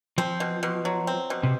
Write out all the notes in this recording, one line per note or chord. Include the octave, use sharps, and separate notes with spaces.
F3 C4
B2
B2
F#3
C4
B2
C3